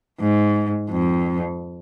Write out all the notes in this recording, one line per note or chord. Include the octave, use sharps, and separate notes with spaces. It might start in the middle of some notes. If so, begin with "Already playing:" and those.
G#2
F2